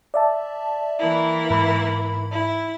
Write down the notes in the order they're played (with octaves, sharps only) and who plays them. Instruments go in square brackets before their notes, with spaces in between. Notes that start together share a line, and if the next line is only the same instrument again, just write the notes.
[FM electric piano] D5 E5 A5
[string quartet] E3 A#3 E4
[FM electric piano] G#2 B5
[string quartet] E4